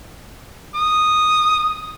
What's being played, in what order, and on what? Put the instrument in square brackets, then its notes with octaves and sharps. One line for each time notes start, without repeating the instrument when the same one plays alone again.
[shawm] D#6